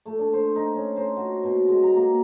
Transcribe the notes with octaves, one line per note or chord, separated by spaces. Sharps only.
A3
D4
C5
D#4
C#4
C5
F#4
B2
G#3
A#5
A#3